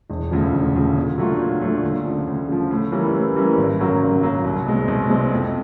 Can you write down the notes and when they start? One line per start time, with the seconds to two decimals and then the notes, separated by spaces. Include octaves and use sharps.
0.10 E1
0.31 D2 C#3 F3
0.53 E1
0.75 D2 C#3 F3
0.96 A#2
1.18 F#3 A3 D4 F4
1.40 A#2
1.61 F#3 A3 D4 F4
1.83 D2
2.05 C#3 F3
2.27 D2
2.49 C#3 F3
2.71 A2
2.92 E3 G3 A#3 C#4
3.14 A2
3.36 E3 G3 A#3 C#4
3.57 G#1
3.79 F#2 C#3 F#3 A#3
4.01 G#1
4.23 F#2 C#3 F#3 A#3
4.45 C2
4.66 B2 G#3 C4
4.88 C2
5.10 B2 G#3 C4
5.32 F2